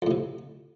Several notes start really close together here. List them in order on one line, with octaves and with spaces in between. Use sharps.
F2 A2 C3